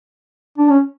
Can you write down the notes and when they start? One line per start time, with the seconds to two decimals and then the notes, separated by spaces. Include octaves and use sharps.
0.58 D4
0.69 C#4